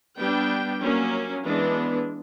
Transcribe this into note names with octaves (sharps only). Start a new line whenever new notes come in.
G3 B3 D4 G5
F#3 A#3 C#4
E3 G#3 B3 D4